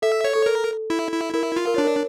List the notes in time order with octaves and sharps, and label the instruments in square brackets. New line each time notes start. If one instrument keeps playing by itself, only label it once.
[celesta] A4 [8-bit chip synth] E5
[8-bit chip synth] C#5
[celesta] A4
[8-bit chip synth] A#4
E4
E4
[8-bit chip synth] E4 [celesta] A#4
[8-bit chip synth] F4
[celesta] A#4
[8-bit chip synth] D4 [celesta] C#5
[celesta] A#4